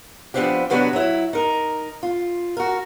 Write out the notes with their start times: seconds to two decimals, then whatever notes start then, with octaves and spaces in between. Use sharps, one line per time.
0.34 F3 G3 B3 C4 D4 G4
0.70 C3 F#3 B3 D4 F#4
0.93 F#3 E4
1.33 D#4 A#4
2.03 F4
2.57 F#4 A#4